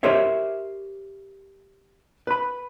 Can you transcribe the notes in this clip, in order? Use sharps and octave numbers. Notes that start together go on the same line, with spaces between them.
G4 A#4 C5 C#5 E5
B4 B5